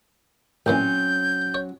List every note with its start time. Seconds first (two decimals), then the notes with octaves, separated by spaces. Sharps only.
0.66 A1 A#2 E3 F#3 C4 C#4 G6
1.54 C#5